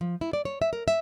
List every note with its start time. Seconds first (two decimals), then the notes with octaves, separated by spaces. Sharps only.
0.01 F3
0.21 E4
0.33 D5
0.45 C#5
0.62 E5
0.73 A#4
0.88 E5